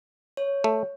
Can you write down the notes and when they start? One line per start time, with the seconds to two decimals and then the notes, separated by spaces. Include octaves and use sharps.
0.37 C#5
0.64 A3